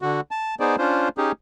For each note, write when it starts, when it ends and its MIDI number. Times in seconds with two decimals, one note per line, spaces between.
0.02 0.20 50
0.02 0.20 66
0.31 0.55 81
0.60 0.76 59
0.60 0.76 63
0.60 0.76 68
0.60 0.76 72
0.60 0.76 74
0.78 1.09 61
0.78 1.09 62
0.78 1.09 65
0.78 1.09 72
1.18 1.32 61
1.18 1.32 63
1.18 1.32 67
1.18 1.32 68